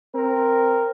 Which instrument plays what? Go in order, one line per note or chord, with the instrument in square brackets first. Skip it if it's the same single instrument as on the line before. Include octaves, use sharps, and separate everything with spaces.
[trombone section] C4 A#4